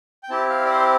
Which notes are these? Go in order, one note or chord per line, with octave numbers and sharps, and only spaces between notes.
G5
C4 E4 G4 A5
F5
D5
C5